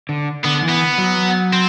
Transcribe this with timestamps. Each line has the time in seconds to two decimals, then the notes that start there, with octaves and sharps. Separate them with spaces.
0.09 D3
0.45 D3 B3
0.63 E3
0.69 B3
0.98 F#3
1.53 C4